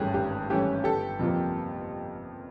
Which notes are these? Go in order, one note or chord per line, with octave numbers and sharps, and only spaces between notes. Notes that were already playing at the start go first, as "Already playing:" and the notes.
Already playing: G#1 G2 E3 A3 C#4 G4 G#4
G#1 G4
G2 E3 A3 C#4 G4
G1 G4 A4
F2 C3 F3 A#3